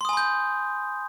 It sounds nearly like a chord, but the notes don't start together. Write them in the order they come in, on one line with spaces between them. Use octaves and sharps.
C6 D#6 G#5 B5 G6